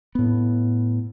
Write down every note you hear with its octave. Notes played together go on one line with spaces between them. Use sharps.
A2 B3